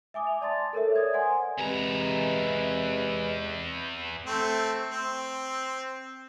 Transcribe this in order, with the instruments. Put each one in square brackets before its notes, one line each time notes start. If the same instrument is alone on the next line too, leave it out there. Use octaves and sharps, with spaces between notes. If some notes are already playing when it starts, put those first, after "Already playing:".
[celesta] E5 G#5 D6 D#6
F7
D5 A5 C6 A6
A4 A#4 C#5 E5
D5 D#6 G#6
C5 F#5 G#5 C6
[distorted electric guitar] E2 A#5 [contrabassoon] C3 [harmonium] G#3 B4
[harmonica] A3 C4
C4